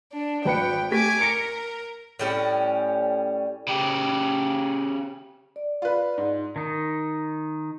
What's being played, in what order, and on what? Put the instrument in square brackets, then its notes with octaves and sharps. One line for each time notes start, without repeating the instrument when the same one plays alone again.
[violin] D4
[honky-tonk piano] G#1 B4 C#7 [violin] G5
[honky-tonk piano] A3 G4 B6 [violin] G#5 D6
[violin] A#4 [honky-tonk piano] A#6 C#7
[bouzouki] A2 G3 C#4
[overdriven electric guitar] C#3 G4
[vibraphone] D5
[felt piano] F4 B4
G#2
[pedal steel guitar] D#3 D#4